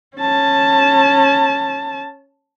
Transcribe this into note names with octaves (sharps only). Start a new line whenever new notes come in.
C#4 A5